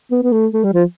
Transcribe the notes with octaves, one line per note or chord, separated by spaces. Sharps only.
B3
B3
A3
A3
G3
F3